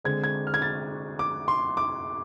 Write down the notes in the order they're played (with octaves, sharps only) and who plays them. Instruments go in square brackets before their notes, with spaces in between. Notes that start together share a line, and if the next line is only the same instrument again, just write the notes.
[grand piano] D3 G#3 C4 G#6
G#6
F6
G#6
A6
D6
C6
D6